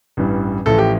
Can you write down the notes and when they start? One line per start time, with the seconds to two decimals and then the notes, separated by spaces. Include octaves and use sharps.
0.17 A1 G2 E3 G3
0.66 A1 A2 F3 A4
0.78 G4